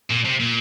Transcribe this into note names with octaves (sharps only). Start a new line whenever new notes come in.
A#2
C3
A#2